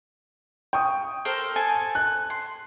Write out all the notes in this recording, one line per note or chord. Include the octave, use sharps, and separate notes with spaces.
G5 C#6 D#6
A4 A#4 C5
A4 G#5 A5
F#6
C6